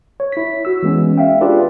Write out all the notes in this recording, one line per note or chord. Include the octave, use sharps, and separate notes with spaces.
C#5
E4 B6
F#4 E6
E3 G#3 B3 C#4
E5 F5 G5
D4 F4 G4 G#4 B4 D5